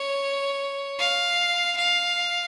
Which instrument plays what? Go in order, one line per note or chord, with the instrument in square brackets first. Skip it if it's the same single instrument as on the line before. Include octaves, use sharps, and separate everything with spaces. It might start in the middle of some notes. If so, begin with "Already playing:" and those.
Already playing: [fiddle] C#5
F5
F5